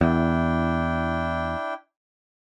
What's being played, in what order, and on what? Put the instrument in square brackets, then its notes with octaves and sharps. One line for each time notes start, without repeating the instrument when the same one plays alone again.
[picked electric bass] E2 [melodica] D4 E4 G5